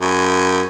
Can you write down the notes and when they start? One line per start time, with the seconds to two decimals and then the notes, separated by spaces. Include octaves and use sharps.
0.01 F#2